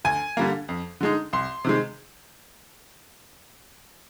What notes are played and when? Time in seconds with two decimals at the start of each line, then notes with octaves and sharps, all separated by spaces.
0.05 D2 G#5
0.37 D3 G3 A#3
0.69 F2
1.01 D3 G#3 D#4
1.33 C2 C6
1.65 C3 D#3 G#3